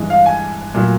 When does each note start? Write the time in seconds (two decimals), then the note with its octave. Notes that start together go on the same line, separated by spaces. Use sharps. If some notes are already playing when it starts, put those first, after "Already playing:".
Already playing: G2 E3 G#3
0.10 F5
0.26 G#5
0.75 A#2 F#3 A3